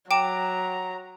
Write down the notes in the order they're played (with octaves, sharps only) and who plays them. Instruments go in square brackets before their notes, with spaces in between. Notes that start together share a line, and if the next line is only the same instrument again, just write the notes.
[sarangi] F#3 [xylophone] G5 D6 E7 [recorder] A#5